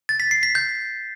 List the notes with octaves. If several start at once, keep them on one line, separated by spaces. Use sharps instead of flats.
A6
B6
C7
B6
G6